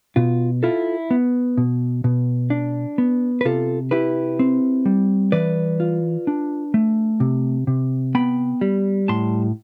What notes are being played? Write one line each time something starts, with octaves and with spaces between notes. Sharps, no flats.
B2 F4
E4 F4 A4
B3
B2
B2
D4
B3
B4
C3 F4 A4
E4 G4 B4
C4
G3
E3 B4 D5
F4
D4
A3
C3
C3
B3 G5 B5
G3
A2 A5 C6